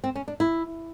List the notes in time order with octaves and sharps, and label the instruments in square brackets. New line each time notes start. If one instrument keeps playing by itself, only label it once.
[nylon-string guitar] C4
C#4
D4
E4